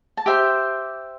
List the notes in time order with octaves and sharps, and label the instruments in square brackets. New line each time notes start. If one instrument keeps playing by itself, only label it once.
[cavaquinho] A5
G4 C5 E5 G5